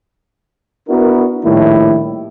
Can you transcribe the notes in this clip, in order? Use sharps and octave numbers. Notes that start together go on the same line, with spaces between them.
B3 D4 E4 F#4 A#4
A#1 A2 D#3 G3 A3 E4